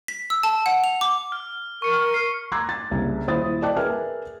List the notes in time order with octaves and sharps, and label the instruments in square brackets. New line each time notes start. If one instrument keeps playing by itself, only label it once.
[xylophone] B6
E6
A5
F#5
F7
D6
[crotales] F6
[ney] A#4 [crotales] C#6 C#7
[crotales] C7
[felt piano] A#5 C6 D6 E6 F#6 G#6
A6
F#1 C2 G2
D#1 E4 C5 D#6 A6
D5 D#5 G5 A5 D6 F#6
G#4 A#4 B4 E5 G#5 F6